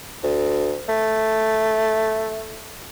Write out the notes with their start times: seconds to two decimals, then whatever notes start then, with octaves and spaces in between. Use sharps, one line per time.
0.24 D2
0.89 A3